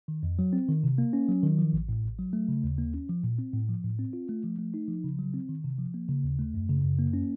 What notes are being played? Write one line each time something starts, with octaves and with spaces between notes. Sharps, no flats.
D#3
F2
F#3
C4
D#3
C3
A#3
C#4
F#3
D#3
F3
A1
A2
A1
F#3
A3
C#3
D#2
A#3
C#4
F3
A#2
C4
A2
F3
A2
C4
F4
A3
F3
A3
D#4
F3
C#3
F#3
C4
D#3
C3
F3
A#3
C#3
D#2
A3
F#2
C#3
F#2
A#3
C#4